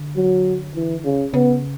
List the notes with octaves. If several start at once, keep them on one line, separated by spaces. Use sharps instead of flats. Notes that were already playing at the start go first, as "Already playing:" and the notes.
Already playing: D3
F#3
E3
C#3
C#3 B3